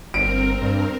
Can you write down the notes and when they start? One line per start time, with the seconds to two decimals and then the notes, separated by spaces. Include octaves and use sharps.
0.14 G1 C4 A#4 D7
0.62 G2